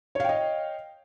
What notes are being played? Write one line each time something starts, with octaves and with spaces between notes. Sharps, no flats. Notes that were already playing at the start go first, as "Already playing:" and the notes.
C#5 D#5 F5 G5